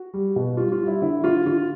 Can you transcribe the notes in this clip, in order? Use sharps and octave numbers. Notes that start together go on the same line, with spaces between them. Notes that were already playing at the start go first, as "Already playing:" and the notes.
Already playing: F#4
G3
B2
G3 F4
F4
G3
E4
D3 E4
D3 F4
D3 F4